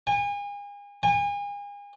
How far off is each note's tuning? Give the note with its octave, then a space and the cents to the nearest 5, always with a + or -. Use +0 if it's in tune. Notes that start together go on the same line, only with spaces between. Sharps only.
G#5 -35
G#5 -35